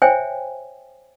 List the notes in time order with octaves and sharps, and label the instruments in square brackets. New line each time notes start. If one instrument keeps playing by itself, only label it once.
[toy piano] C5 C#5 E5 G5 G#5